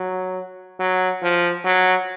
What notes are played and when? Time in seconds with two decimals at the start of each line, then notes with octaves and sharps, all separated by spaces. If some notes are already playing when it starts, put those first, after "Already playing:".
Already playing: F#3
0.80 F#3
1.23 F3
1.65 F#3